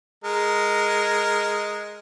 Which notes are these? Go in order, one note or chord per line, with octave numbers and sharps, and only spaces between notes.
G#3 A#4